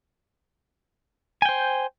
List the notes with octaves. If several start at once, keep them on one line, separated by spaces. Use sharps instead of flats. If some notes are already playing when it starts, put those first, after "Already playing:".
C5 G5 G#5